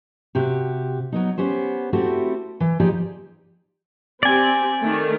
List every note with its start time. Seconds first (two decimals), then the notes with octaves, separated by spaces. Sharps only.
0.35 C3 F#4 G4
1.12 F#3 B3 D#4
1.38 B3 C#4 G4 C5
1.93 A3 C4 E4 F#4 G4 A4
2.60 E3
2.80 F3 D#4 G4 G#4 D5
4.23 C4 G4 D5 G#5
4.80 D#3 A3